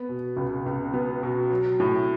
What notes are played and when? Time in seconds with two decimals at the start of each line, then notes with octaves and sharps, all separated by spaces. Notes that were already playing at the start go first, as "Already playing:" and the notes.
Already playing: B3
0.09 B2
0.37 C#2
0.66 C#2
0.94 B3
1.23 B2
1.51 F#3
1.80 A2